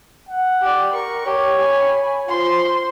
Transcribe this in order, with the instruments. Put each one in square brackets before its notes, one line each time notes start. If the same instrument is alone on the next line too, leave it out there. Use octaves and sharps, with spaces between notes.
[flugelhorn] F#5
[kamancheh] G4 D5
[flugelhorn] A#4 [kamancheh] C#6
[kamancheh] G4 [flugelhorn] C#5
[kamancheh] G#5 B5
[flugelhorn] F4 [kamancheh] C5 C6